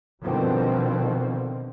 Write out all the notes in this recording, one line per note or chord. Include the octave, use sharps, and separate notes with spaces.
B2 D3 D#3 F3 G3 C4